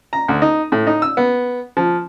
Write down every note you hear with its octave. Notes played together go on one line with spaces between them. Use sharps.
A#5
D2
D#4
A2
D#4
E6
B3
F3